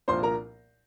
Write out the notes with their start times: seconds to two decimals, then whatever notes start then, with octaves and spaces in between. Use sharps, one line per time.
0.08 C2 A#2 F3 A#3 D4 C5 C6
0.23 A#4 A#5